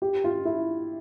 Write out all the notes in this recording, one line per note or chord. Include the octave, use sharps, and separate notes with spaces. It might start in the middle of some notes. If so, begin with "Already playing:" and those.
G4
F4
E4